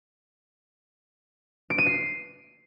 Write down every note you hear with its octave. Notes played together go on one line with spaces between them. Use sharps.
D7
D#7
C7